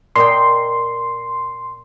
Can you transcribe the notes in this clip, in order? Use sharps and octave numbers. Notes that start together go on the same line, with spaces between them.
A#2 D#5 G5 C6